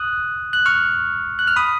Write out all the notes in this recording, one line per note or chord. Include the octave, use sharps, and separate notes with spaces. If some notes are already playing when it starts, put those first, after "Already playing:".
Already playing: D#6 F#6
F#6
C#6 F6
F#6
F6
B5 D#6